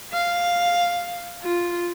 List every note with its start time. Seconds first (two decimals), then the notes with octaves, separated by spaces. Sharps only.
0.13 F5
1.43 F4